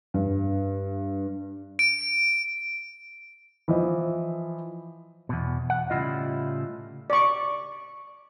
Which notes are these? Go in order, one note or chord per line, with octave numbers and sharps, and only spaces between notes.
G2
D7
E3 F3 D#5
E2 B2
F#5
A2 C#3 G3 E4 F4 D#5
D5 C#6